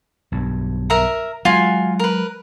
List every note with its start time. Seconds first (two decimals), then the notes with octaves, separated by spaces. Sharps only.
0.32 B1 G2
0.90 A#4 E5 A#5
1.45 F#3 G#3 F4 F#4 G#5
1.99 A#4 B4